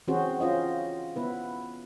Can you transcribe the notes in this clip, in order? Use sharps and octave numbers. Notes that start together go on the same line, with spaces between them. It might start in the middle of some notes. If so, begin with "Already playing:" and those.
E3 C4 C#4 F#4 G#4 C5
C#4 F4 C5 D#5
B3 E4 B4